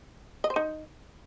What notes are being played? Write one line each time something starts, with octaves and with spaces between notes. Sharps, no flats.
D#5
C5
D#4